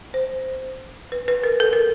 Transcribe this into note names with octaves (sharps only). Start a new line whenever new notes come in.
C5
B4
B4
A#4
A4
A#4